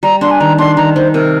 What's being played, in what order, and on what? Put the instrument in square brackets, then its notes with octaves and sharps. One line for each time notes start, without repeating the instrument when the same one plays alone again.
[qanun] G3 [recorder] A#5
[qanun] D4 [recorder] C6
[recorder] G#5
[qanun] D#3 [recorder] A#5
[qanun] D4 [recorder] C6
[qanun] D#3 [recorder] A#5
[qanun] D#3 [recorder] C5
[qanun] C3 [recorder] A#4